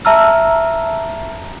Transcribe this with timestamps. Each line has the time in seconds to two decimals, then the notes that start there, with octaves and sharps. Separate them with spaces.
0.05 E5 A5 A#5 E6 F6